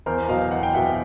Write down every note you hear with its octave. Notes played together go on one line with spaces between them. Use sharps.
E2 A#4 C5
B2 F#3 D#5 F5
E2 F#5
G5
B2 F#3 E5 F#5